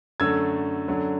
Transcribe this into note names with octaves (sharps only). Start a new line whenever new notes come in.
F#2 D3 F#3 A3 E6 G#6
F#2 D3 F#3 A3